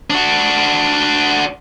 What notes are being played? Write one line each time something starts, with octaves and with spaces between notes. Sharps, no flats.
D4 F#4